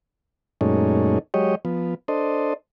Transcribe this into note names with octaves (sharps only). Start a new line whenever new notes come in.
F#2 A#2 G#3 A3 C#4 D#4
F#3 G#3 G4 C#5 D#5
F3 B3
D4 A4 C5 D#5